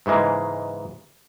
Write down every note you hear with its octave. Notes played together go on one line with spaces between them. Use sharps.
G#2 C#3 E3 G#3 A#3